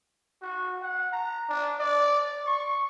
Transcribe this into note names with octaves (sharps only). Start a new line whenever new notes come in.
F#4
F#5
A#5
D4
D5
C#6